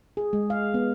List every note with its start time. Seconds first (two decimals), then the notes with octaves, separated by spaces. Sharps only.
0.17 G#4
0.33 G#3
0.50 F5
0.74 B3